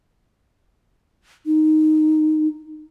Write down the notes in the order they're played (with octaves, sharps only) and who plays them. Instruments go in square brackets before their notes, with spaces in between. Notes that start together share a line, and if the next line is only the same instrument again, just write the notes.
[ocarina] D#4